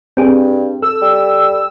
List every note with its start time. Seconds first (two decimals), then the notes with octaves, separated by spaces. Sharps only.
0.17 G2 C4 G4 G#4
0.82 A4 E6
1.02 G3